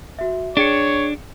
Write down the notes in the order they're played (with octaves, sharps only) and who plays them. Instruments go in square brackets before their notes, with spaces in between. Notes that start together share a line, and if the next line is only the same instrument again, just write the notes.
[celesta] F#4 E5
[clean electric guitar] D4 [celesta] G#4 G5 C#7 [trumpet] C#5